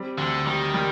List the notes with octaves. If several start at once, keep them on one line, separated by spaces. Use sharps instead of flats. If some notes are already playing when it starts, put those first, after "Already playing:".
Already playing: G3 C4
D2 D3
D#3 G3
G3